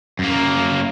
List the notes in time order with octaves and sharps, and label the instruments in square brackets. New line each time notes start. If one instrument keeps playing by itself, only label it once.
[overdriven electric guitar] F#2 A#3